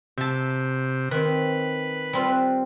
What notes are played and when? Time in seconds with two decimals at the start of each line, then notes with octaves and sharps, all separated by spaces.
0.18 C3 E5 A5
1.11 D#3 C4 B4
2.13 G3 C4 F4